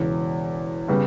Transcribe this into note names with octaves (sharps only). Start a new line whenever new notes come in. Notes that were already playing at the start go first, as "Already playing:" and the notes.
Already playing: E1 E2 C#3
C#3 G3 B3